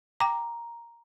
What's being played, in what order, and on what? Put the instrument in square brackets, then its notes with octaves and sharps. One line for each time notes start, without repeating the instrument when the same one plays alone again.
[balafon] G5 D6 [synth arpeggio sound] A#5